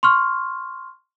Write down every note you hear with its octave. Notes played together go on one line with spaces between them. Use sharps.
C6 C#6 F6